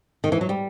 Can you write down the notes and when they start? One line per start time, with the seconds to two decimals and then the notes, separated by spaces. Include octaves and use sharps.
0.24 D#3
0.32 E3
0.41 F#3
0.49 G3